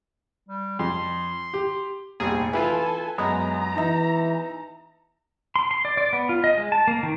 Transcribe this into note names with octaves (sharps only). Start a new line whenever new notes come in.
G3
F2 C6
G4
F1 A#1 G3 G#4
E3 E4 F4 A4 B4 G#5
F#2 G#3 B3 A#5
E3 D#4 E5
C6
C6
D5
D5
B3
F4
D#5
G#3
A5
A#3
D#3